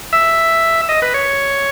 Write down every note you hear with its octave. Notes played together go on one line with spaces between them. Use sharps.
E5
D#5
B4
C#5